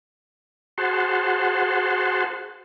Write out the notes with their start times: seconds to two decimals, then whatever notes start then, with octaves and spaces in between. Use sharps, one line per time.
0.78 F#4 G#4 C5 F#5 A5 C6